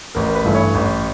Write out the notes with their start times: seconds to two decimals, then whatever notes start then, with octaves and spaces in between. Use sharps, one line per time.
0.15 A1 A#4
0.35 B4
0.44 G2 E3 A3
0.54 C#5
0.74 A1